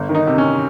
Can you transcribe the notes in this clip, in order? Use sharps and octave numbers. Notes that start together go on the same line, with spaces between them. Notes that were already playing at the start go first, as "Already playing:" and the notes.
Already playing: G1
D#3
D#4
C3
C#4